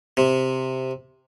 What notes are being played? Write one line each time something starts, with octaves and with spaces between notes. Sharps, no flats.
C3